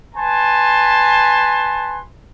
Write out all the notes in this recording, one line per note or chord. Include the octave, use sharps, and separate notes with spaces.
B4 G#5 A5 C6